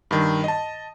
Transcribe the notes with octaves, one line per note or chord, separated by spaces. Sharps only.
G2 D#3
D#5 A5